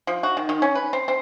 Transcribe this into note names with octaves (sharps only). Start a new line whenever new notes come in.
F3
F#4
D#3
D#3
C#4
B4
C4
C4